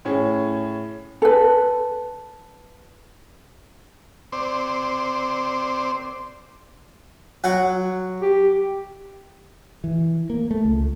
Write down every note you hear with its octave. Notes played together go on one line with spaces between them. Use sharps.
A2 C#4 G#4
A4 B4
C4 C5 D5
F#3 F#5
G4
E3
A#3
A3
C#2